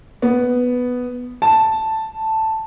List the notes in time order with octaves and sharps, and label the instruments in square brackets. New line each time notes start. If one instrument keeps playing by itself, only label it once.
[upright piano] B3
A5